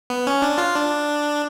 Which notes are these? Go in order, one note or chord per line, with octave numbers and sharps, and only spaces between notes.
B3
C#4
D4
F4
D4